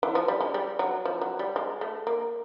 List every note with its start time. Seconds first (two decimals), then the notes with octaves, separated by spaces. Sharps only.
0.03 E3
0.15 F3
0.28 G3
0.41 G#3
0.54 G3
0.79 F#3
1.05 F3
1.21 F#3
1.39 G3
1.56 G#3
1.81 A3
2.07 A#3